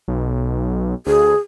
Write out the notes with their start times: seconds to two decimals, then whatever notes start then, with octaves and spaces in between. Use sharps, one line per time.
0.08 B1
1.06 D2 G#4